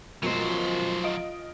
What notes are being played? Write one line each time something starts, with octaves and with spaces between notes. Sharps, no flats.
F#2 B2 F3 F#3 G#3 C5
F4 D#5 D7